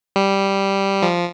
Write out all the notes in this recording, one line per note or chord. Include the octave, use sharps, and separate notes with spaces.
G3
F3